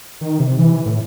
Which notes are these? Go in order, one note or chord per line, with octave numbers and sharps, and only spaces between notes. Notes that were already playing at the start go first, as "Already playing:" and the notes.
D#3
C3
E3
A2